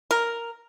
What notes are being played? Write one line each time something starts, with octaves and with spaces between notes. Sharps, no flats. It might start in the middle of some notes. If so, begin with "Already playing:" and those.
A#4